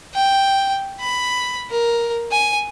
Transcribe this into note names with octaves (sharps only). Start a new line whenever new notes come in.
G5
B5
A#4
G#5